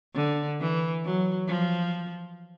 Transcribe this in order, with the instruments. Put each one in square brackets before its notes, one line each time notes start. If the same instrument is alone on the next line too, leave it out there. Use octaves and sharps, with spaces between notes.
[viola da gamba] D3
E3
F#3
F3